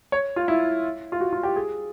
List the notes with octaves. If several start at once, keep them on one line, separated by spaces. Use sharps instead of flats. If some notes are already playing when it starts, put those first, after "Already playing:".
C#5
F4
E4
F4
F#4
F4
G4
G#4